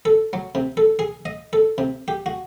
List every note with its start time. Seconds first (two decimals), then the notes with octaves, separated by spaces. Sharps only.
0.05 A4
0.33 F#3
0.55 C3
0.77 A4
0.99 G#4
1.25 D#5
1.53 A4
1.78 C3
2.08 G4
2.26 F#4